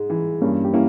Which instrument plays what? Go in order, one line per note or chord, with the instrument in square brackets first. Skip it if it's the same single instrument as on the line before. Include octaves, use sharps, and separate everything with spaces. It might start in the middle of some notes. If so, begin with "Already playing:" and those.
Already playing: [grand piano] G#2 G#3 D#4
E3
[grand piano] G2 [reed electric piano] A#3 C#4
[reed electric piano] G4
[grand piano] A#3 [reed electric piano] C#4 E4